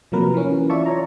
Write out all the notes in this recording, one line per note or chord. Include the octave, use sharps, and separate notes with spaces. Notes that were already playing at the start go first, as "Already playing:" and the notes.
C3 F3 F#3 A#3 A#4 B4
E3 C#4
F4 D5 E5 A5 C#6
C#5 A#5